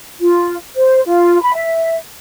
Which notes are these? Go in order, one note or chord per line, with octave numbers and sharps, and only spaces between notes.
F4
C5
F4
B5
E5